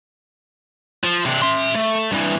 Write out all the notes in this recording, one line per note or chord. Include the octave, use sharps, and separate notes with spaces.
F3
C3 D4
E5 C6
A3
G2 E3